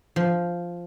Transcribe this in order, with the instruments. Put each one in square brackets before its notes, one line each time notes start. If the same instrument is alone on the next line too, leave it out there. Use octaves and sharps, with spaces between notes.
[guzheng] F3